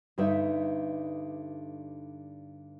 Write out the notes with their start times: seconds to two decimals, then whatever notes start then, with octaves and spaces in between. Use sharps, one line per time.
0.18 G2 D3 D#4 B4 E5